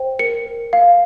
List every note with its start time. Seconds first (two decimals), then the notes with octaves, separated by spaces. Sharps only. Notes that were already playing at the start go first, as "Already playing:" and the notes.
Already playing: C5 G5
0.19 A#4 C#7
0.46 A#4
0.73 F5